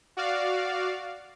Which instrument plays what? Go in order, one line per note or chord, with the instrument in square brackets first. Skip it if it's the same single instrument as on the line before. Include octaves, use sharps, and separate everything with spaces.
[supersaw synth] F#4 D5 F5